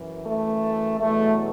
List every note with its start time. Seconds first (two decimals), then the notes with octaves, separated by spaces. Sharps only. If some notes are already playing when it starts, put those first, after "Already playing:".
Already playing: F#2 E3
0.25 A3
0.99 E2 B2 F#3 A3